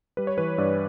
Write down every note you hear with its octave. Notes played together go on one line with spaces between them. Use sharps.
G3 B4
C#5
E3 B4
G2 D5